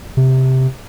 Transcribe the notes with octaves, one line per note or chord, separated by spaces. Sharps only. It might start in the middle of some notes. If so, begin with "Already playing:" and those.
C3